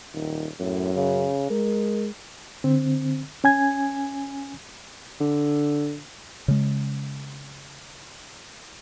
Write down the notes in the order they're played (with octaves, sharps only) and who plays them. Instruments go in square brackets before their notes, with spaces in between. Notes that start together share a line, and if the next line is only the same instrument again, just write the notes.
[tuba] D#1 [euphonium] D#3
[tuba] F#2 [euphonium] A2
[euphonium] C#3
[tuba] G#3 [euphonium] A#4
[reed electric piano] D3 C4
C#4 G#5 G#6
[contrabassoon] D3
[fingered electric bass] C#3 G#3